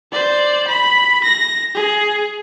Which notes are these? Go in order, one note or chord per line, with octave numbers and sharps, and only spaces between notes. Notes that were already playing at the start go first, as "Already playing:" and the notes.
C5 D5
B5
A#6
G#4